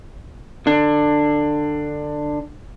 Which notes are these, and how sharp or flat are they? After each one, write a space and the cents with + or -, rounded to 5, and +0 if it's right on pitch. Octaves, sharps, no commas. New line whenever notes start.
D3 +20 D4 +15